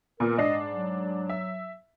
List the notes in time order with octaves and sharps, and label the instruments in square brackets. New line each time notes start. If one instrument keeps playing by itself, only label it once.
[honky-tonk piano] A#2 B3 [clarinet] A#4
[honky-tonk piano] G#2 D4 C7 [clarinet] D#5
[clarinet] F#3
[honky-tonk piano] E5